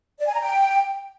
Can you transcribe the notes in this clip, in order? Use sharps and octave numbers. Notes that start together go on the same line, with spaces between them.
D5
G#5
A#5
G5